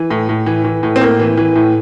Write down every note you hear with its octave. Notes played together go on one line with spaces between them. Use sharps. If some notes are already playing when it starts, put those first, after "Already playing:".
Already playing: E3
A2
A2
E3
E3
A2
C4
A2 A#3
E3
E3
A2